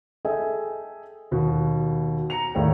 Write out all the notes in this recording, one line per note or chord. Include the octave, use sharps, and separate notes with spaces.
G#4 A4 D#5 E5 G5 G#5
D#2 B2
A#5 C#7 F7
D#2 A2 E4 G#4 D5 G5